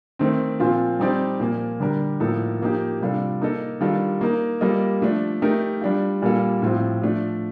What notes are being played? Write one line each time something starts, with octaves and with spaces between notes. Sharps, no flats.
D#3 A3 C4
A#2 F3 C4 F4 C5
G3 C4 D#4 G4 D5
A#2 F3 A#3
D3 G3 D4 G4 A#4
A2 F3 A#3 D#4 A4
F3 A#3 D#4 G4
C3 G3 D4 F4 A4
A#3 D#4 A4 D#5
D#3 G3 D4 F4 A4
A#3 D#4 A#4
G3 A#3 F4 A4 D#5
F3 A3 D4
A3 D#4 G4 A#4
G3 D4 F4
A#2 G3 A#3 F4 A4
A2 F3 C4 F4
F3 A3 D4